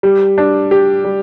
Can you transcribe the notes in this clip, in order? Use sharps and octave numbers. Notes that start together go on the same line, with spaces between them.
G3
D4
G4
G3